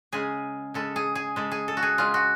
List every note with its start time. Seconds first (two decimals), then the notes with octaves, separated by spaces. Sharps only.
0.12 C#3 G#3 G#4
0.74 C#3 G#3 A4
0.96 G#4
1.15 G#4
1.36 C#3 G#3 A4
1.52 G#4
1.68 A4
1.77 F#4
1.83 G#4
1.98 C#3 G#3 F4
2.14 F#4